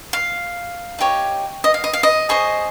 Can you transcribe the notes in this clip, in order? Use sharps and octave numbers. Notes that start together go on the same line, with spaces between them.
F5
D#4 G4 C#5
D#5
F5
D#5
F5
D#5
G#4 C5 D#5 C#6